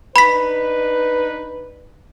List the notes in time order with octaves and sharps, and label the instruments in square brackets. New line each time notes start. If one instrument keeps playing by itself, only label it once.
[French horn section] D4 D#4 B4 [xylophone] B5 B6